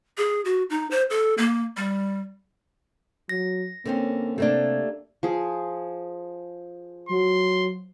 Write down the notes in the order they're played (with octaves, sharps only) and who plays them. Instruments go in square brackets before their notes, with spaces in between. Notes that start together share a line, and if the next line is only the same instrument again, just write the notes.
[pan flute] G#4
F#4
D#4
C5
A4
A#3
G3
[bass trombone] F#3 [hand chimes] A#6
[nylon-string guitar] D3 C4 C#4 [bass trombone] A#3
[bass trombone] C3 [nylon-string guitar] A3 A#3 D4 [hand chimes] G4 D5
[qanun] F3 G#4
[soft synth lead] F#3 [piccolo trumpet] C6